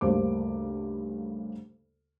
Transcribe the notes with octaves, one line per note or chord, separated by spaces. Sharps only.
D2 G2 C#3 A#3 C5 D6